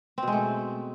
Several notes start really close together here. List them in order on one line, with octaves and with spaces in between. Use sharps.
C4 B2 G#3 A3